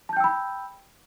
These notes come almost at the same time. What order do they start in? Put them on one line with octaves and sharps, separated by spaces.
A5 G6 G5 E6 B5